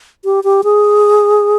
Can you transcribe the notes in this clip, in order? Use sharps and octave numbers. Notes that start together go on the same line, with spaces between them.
G4
G4
G#4